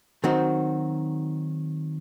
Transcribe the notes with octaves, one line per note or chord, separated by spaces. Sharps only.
D#3 F#3 C4 D#4 F#4